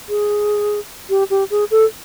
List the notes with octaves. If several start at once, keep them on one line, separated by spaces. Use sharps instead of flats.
G#4
G4
G4
G#4
A4